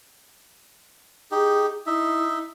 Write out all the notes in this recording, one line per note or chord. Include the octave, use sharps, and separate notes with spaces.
D#4 G4 G#4
D#4 E4 E5